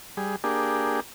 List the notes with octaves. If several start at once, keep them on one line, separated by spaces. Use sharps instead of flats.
G3 G#4
A#3 D4 G4 G#4